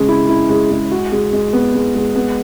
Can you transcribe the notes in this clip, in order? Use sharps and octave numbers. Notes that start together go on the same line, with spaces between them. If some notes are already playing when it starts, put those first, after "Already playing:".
Already playing: C#3 G#3
E4
E4
G#3
G#3
F#4
G#3
G#3
B3
G#3
G#3
B3